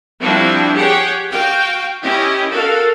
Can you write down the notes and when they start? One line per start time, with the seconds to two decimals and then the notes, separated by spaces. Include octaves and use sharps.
0.21 F3 G3 C4 D4 E4 F#4
0.75 G4 G#4 C#5 F#5 G5
1.31 F#4 F5 G5
2.03 C#4 E4 G4 D#5
2.50 F#4 A4 A#4 F5